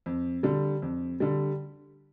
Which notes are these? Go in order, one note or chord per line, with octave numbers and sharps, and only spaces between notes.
F2
D3 G3
F2
D3 G3